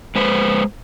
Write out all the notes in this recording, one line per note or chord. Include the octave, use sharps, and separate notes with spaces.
G#3 B4 C5